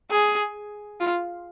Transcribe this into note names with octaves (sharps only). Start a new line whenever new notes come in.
G#4
F4